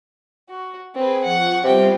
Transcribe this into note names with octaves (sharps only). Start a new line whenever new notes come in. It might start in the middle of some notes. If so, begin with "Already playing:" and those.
F#4
C4 G#4 B4
F3 F#5 C#6
C3 G3 B3 C4 F4 G5